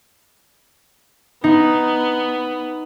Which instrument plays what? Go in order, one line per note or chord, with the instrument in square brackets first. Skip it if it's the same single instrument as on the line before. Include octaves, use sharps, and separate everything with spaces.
[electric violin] B3 [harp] D#4